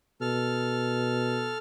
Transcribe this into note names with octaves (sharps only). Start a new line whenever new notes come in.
B2 A4 F6